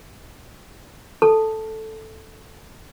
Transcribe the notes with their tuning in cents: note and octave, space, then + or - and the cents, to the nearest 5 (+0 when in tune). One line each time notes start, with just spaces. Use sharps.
A4 +0 A5 +0